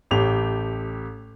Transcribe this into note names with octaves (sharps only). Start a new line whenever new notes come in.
A1 G4 A4 F7